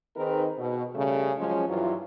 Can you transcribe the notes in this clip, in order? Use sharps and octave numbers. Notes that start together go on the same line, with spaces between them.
D#3 C4 D#4 G#4 A#4 B4
B2
C#3 G3 A3
F3 F#3 G#3 C#4
G2 E3 F#3 E4 F4